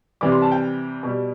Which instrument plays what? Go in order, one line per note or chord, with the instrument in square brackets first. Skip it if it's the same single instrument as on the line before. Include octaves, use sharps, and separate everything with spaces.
[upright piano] C3 E3 G3 D6
C6
A5
G5
B2 G3